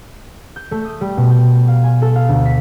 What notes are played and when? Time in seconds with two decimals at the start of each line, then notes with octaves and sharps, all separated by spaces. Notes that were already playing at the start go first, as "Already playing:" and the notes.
0.56 G6
0.71 A3
0.85 D#6
1.01 G3
1.17 B2
1.31 G5
1.68 F5
1.83 G#5
2.02 A4
2.16 F5
2.29 D2
2.46 B6